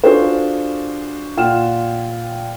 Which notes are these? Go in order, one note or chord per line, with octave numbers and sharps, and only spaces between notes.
D4 F4 F#4 G#4 A4 C5
A#2 F4 F#5 G5 F6 E7